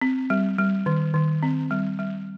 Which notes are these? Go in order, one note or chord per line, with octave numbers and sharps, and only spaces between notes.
C4
G3
G3
D#3
D#3
C4
G3
G3